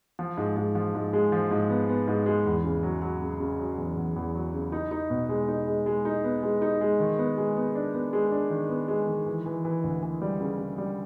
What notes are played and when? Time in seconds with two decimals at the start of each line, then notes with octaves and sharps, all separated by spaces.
0.19 F3
0.37 G#2
0.57 G#2
0.75 F3
0.95 G#2
1.13 G#3
1.32 F3
1.51 G#2
1.70 B3
1.89 B3
2.08 G#2
2.26 G#3
2.46 E2
2.64 C#3
2.83 F#3
3.02 F#3
3.22 C#3
3.40 C#3
3.60 F#3
3.78 E2
3.97 E2
4.16 E2
4.35 F#3
4.54 C#3
4.72 D#4
4.91 D#4
5.10 B2
5.29 G#3
5.48 D#4
5.67 G#3
5.86 G#3
6.05 D#4
6.24 B3
6.43 G#3
6.62 D#4
6.81 G#3
7.00 D#3
7.18 B3
7.38 G#3
7.56 B3
7.75 D4
7.94 B3
8.13 G#3
8.32 D4
8.50 D#3
8.69 B3
8.88 G#3
9.08 D#3
9.26 E3
9.46 E3
9.65 E3
9.84 D2
10.03 E3
10.22 G3
10.41 C#3
10.59 C#3
10.78 G3